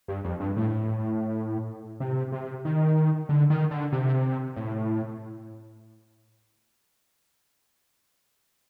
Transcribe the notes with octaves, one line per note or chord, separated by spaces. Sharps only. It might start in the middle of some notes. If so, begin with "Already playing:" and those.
G2
F2
G2
A2
C3
C3
D#3
D3
D#3
D3
C3
A2